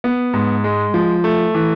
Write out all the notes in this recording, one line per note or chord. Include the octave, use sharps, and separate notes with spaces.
B3
G#2
G#3
F3
A3
E3